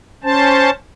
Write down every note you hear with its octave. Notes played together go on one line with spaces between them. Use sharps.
C#4 C5 A5